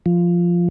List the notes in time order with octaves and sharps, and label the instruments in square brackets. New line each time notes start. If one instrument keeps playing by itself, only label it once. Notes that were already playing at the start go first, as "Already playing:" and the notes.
[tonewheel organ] F3